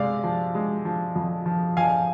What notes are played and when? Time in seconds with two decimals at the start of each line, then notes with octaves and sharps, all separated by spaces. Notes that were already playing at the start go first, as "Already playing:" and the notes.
Already playing: C3 G#3 D5 F5
0.24 F3
0.55 G#3
0.85 F3
1.16 F2
1.46 F3
1.77 F3 F5 G#5